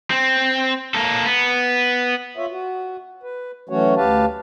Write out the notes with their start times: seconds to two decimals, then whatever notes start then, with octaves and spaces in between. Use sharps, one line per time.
0.10 C4
0.94 A#3 A4
1.26 B3
2.37 F4 C#5 E5
2.51 F#4
3.23 B4
3.69 E3 F#3 A3 C#4 F#4 C#5
3.97 D2 G4 B4 F5 A5